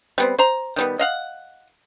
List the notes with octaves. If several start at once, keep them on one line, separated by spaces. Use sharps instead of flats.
G3 B3 C4
C5 A#5
D#3 G3 B3
D#5 F5 F#5